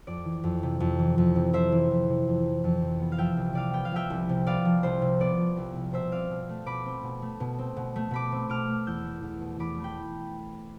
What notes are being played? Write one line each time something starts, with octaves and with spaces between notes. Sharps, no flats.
F2 D5
E3
F2
C3
F2
E3
F2
C3
F2 C5 E5
E3
F2
C3
F2
E3
F2
C3
B3
F5
F3 E5 G5
C2
C3 D5 F5
B3 G5
F5
F3 E5 G5
C2
C3
B3 D5 F5
F3
C2 C5
C3
B3 D5
F3
C2
C3
B2 C5 E5
C4 D5 F5
B2
A3
B2 B5 D6
C4
B2
A3
B2
C4
B2
A3
B2 B5 D6
C4
B2 D6 F6
A3
E2 E6 G6
A3
E2
B2
E2 B5 D6
A3
G5 B5